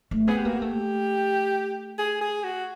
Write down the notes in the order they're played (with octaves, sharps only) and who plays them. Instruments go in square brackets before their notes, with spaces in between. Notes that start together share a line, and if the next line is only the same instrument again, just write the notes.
[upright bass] A3
[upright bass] B3 [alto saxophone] G#4
[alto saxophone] G4
[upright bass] A#3 [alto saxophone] F#4
[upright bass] A3 [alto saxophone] G4
[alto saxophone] G#4
G#4
F#4